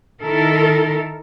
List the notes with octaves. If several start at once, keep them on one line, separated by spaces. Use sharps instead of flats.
D#3 E4 A4 A#4